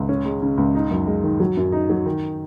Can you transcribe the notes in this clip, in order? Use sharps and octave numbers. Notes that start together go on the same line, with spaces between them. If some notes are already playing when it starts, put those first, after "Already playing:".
Already playing: C#2
C#4
G#3
C#3
C#2
D#4
F#2
G#3
D#3
F#3
F#2
D#4
F#3
D#3